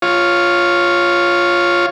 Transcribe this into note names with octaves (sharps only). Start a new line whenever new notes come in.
F4 C#5